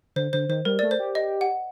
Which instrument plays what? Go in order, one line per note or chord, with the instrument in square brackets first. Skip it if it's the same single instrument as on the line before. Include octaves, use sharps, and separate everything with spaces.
[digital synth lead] D3 [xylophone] C5
[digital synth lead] D3 [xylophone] C5
[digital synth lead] D#3 [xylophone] C5
[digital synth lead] G3 [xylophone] A#4
[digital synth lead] A3 [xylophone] D5
[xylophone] C5
[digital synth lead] G4
[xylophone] D#5
F#5